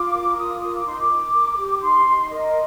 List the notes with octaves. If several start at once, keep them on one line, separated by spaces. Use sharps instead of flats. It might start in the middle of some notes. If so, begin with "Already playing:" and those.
Already playing: F4 D6
A#4
F4 D#6
A#4 D#6
D6
D#4 C6
D6
D#4
A#4
G4
D#4 C6
D#4
A#4 D#5